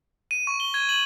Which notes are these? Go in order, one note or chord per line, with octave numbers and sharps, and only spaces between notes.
D#7
C#6
G7
G#6
F#7